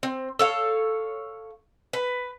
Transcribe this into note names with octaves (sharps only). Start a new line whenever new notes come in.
C4
A4 C#5 F5
B4